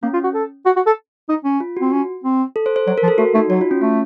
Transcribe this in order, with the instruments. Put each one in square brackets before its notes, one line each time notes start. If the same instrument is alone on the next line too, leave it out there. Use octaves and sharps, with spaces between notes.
[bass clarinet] A#3 [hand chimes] C#4
[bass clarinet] F4
F#4
A4
F#4
F#4
A4
D#4
C#4
[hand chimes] F4
[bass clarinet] C4 [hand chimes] F#4
[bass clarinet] C#4
C4
[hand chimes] A4
C5
C5
[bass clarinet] F#3 [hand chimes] C5
[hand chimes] A#4
[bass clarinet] F3
[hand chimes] A4
[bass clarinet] A3 [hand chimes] F#4
[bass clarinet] A3 [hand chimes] D#4
[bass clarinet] F#3 [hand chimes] F#4
[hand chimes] F4
C#4
[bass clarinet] A3 [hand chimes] C#4